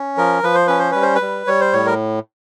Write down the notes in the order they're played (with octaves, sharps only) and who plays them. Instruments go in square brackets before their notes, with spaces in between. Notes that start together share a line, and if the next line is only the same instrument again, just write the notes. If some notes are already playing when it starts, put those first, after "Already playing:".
Already playing: [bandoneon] C#4
F3 A#4
F3 B4
C5
C#4 B4
C5
G3 B4
C5
B4
G3
G3 C#5
C5
A2 C#5
A#4